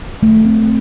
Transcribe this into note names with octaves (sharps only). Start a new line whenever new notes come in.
A3
C4